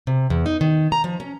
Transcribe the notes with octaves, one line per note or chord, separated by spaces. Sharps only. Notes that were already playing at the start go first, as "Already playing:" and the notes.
C3
E2
D#4
D#3
A#5
F3
C#4